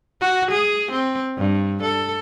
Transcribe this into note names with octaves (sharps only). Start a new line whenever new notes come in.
F#4
G#4
C4
G2
A4